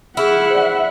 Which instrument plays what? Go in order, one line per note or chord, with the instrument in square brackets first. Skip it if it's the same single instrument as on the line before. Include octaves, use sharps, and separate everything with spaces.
[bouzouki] E4 [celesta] G#4 F6 [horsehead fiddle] E5 F#5
[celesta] C5 D5